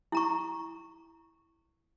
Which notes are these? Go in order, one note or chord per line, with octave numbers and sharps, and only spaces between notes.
E4 A#5 C#6